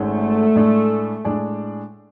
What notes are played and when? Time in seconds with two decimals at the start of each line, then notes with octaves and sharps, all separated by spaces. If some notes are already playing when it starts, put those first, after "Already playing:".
Already playing: G#1 G#2 G#3 A3 C#4
0.55 A2 G#3 D4 G#4 D5
1.25 A2 G#3 D4 G#4 D5